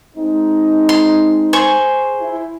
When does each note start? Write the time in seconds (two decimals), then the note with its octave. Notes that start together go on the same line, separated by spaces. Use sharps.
0.16 G#3 C4 D#4
0.89 C6
1.53 G#4 C5 C#6
2.19 E4